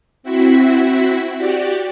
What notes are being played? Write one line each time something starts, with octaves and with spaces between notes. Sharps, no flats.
C4 E4 F#4 B6
F#4 G4 D5